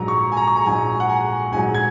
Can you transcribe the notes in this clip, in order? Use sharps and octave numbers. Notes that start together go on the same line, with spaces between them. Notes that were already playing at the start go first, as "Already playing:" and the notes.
Already playing: A#1 G#2 F#3 A#5
C#6
G#5
A#5
C#6
A#5
A#1 G#2 F#3 G#5
F#5
G#5
A#1 G#2 F#3 G#5
G#6